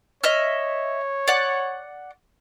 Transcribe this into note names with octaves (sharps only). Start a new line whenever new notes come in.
C#5 D#5 E5 F6
D5 F#5